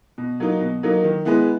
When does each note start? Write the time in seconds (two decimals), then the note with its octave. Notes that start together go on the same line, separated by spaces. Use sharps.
0.18 B2
0.40 F#3 A#3 D#4
0.61 B2
0.83 F#3 A#3 D#4
1.04 D#3
1.25 G#3 B3 E4